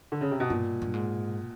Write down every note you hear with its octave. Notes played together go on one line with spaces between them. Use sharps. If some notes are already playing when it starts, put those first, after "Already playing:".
D3
C#3
C3
B2
G2 A#2
G2
G#2